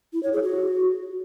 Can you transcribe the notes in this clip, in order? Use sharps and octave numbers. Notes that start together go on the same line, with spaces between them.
E4
C#5
G#4
F#4